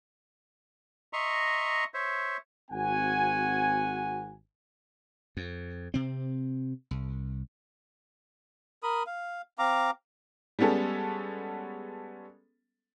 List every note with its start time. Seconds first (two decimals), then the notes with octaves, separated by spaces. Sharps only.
1.13 D#5 E5 A#5 C6 C#6
1.94 C5 C#5 E5
2.71 G#1 C4 F#4 F#5 G#5
5.37 F2
5.94 C3 C4
6.91 C2
8.83 A#4 B5 D#6
9.07 F5
9.59 C4 F5 A#5 D6
10.59 G3 G#3 B3 C#4 A4